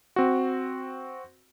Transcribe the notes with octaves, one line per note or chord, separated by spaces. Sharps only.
C4 F#4